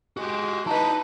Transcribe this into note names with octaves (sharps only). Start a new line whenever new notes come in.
G#3 F#4 G4
D#4 E4 B4 D#5 A5